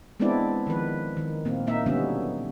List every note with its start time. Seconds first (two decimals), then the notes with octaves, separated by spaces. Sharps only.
0.20 G#3 B3 C4 D4 E4 D5
0.67 D#3 F3 B4
1.17 D#3
1.45 A#2 A#3 C4
1.67 A#2 A#3 D#4 E5
1.86 B2 D3 F#3 G3 B3 C#4